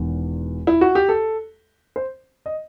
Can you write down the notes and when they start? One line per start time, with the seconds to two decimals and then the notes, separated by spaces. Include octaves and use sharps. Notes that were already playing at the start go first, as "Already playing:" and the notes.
Already playing: E1 E2 D#3
0.67 E4
0.81 F#4
0.95 G4
1.09 A4
1.96 C5
2.46 D#5